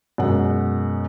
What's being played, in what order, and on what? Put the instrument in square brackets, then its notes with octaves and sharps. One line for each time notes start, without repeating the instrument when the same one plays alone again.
[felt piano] F#2 B2 G#3 F#5